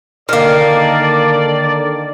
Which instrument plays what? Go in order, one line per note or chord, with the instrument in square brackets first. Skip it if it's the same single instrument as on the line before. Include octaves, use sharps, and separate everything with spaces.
[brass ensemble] D3 A4 D5 [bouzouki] D#3 A#3